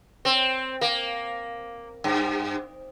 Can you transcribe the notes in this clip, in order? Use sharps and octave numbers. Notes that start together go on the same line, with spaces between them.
C4
A#3
G2